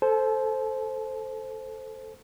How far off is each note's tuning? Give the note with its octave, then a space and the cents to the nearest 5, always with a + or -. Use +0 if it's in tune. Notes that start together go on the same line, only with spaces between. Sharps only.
A4 +0 C5 +0 A5 -40